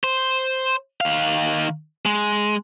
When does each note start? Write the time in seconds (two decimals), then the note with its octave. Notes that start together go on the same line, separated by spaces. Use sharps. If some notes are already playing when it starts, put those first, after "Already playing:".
0.04 C5
1.01 D#3 F5
2.06 G#3